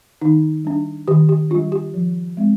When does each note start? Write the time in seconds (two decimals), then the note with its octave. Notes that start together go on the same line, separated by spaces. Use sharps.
0.21 D#3 D#4
0.65 G3 D4
1.08 D#3 G4
1.29 G4
1.50 G3 D4 F4
1.72 G4
1.94 F3
2.37 G#3 C4